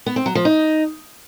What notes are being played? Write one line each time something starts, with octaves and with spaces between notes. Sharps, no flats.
B3
C4
F#3
F3
D#4